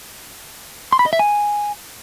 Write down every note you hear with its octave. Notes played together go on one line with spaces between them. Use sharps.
C6
B5
D#5
E5
G#5